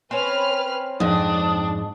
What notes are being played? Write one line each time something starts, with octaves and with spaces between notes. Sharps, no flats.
C4 C#4 B4 F6
F2 G#2 D4 D#6